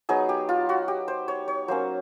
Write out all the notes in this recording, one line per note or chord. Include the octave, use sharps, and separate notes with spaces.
F#3 B3 D#4 G#4
G4
F4
F#4
G4
C5
C#5
C#5
F#3 A#3 C#4 C5